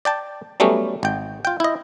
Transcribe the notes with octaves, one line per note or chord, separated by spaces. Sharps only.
D5 G5 A5
F#3 G3 A3 B3 C#4 G4
G#1 G5
F4 G5
E4 D#5